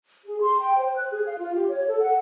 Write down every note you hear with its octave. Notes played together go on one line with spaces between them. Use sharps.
G#4
C6
G5
C5
F#6
G#4
F5
F4
G4
C#5
A4
F#5